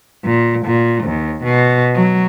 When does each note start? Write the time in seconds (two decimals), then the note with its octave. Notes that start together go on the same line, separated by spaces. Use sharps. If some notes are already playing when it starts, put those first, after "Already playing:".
0.25 A#2
0.66 A#2
1.04 D#2
1.44 B2
1.95 F#3